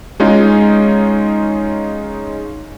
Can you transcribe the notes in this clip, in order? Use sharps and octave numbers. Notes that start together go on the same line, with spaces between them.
G#3 C#4 D#4 F4